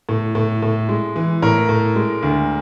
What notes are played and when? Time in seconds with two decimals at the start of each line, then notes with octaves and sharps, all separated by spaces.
0.09 A2
0.35 A2
0.62 A2
0.89 G#3
1.16 E3
1.42 A2 A#4
1.69 A2
1.96 G#3
2.23 D2